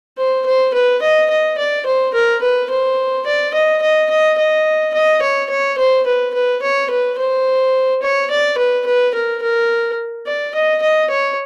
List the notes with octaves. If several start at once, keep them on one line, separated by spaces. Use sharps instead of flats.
C5
C5
B4
D#5
D#5
D5
C5
A#4
B4
C5
D5
D#5
D#5
D#5
D#5
D#5
C#5
C#5
C5
B4
B4
C#5
B4
C5
C#5
D5
B4
B4
A#4
A#4
D5
D#5
D#5
C#5